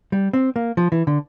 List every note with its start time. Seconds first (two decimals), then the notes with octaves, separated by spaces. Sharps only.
0.12 G3
0.33 C4
0.56 A#3
0.77 F3
0.92 E3
1.07 D3